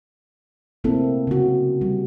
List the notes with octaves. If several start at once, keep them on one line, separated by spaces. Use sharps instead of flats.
C3 A3 A#3 C4 E4 A4
C#3 F#4
G3